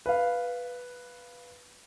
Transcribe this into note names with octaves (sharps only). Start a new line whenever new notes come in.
B4 F5